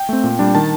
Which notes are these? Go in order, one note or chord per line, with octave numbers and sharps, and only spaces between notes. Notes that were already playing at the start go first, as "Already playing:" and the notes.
Already playing: G5
A3 C4
A#2
G3 D4
D#3 A5